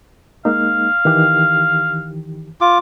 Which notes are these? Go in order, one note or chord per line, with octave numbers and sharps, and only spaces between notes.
G#3 A#3 D#4 F5
D#3 E3 G4
F4 D6